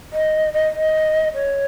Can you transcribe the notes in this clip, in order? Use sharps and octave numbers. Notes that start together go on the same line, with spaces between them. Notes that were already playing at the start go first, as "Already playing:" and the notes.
D#5
D#5
D#5
C#5